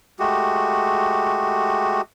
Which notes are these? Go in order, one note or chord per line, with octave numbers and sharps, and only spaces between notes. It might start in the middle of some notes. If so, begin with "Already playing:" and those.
G#3 A3 F#4 G4